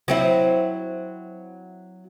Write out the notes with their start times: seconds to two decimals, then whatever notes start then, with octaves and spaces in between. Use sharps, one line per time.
0.08 F#3 C4 E4